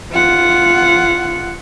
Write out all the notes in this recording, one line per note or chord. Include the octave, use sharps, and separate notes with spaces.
F4 F#5